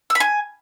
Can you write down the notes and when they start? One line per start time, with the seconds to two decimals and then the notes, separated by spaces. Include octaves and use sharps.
0.10 E6
0.15 B5
0.20 G#5